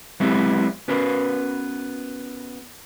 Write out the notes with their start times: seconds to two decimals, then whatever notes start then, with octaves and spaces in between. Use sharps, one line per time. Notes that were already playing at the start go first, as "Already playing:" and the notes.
0.20 F#3 G#3 B3 C4 E4 G4
0.88 B3 C#4 F#4 A#4 B4